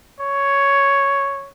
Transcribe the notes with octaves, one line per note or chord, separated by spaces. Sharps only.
C#5